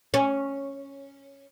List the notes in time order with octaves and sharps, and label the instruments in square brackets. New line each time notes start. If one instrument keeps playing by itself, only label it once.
[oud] C#4